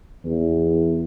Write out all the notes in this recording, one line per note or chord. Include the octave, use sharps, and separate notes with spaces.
E2